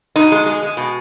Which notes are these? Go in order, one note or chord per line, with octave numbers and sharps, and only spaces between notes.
B2 D#4
G#3
G#3
G#3
B2